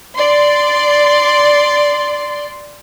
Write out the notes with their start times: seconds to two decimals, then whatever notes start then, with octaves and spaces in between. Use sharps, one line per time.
0.16 D5 C6